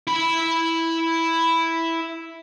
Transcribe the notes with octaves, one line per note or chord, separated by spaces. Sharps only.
E4 B5